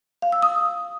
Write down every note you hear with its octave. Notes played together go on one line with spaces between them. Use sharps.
F5
E6
D#6